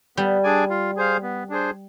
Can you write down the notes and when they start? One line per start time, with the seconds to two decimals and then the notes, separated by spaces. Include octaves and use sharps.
0.17 G3 B3
0.44 D4 G#4 D5 G#5
0.70 F4
0.96 G#4 C5 F5
1.23 B3
1.49 D4 G#4 C5